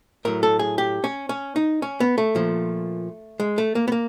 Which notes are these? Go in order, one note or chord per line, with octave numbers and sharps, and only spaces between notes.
A2 F#3 A#4
A4
G#4
G4
C#4
C#4
D#4
C#4
B3
A3
A#2 F3
G#3
A3
A#3
B3
A#3